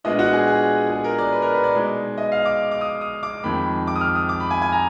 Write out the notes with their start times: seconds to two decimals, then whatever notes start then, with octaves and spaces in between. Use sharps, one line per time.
0.04 A#2 G#3 B3 D4 F4 D#5
0.19 F#4
0.33 G#4
0.47 G#4
0.90 G#4
1.04 A#4
1.18 D5
1.32 B4
1.42 A#4
1.54 B4
1.64 D5
1.74 B2 G#3 D#4
2.18 D#5
2.32 F5
2.45 D6
2.71 D6
2.81 D#6
3.01 D#6
3.23 D6
3.44 F2 D#3 G#3 B5
3.87 D6
3.95 D#6
4.01 F6
4.15 D#6
4.29 D6
4.40 B5
4.50 G#5
4.62 G#5
4.72 A#5